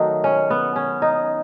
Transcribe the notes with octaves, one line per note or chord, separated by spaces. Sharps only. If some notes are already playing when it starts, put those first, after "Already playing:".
Already playing: D#3 F#3 A3 D#4
C#4
B3
C#4
D#4